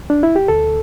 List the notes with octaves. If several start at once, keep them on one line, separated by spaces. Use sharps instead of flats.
D4
E4
G4
D2 A4